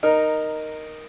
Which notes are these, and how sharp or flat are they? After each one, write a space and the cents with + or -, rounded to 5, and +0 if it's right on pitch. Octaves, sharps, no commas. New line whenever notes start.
D#4 -10 A#4 +0